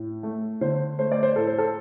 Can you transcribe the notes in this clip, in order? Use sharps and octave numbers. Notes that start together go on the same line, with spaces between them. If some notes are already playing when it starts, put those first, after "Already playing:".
Already playing: A2
A3
D3 C5
A3 C5
D5
C5
A2 A4
C5
A4